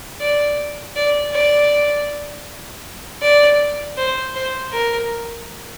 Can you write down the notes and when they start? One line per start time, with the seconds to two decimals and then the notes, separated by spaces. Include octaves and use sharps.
0.20 D5
0.96 D5
1.33 D5
3.22 D5
3.98 C5
4.35 C5
4.72 A#4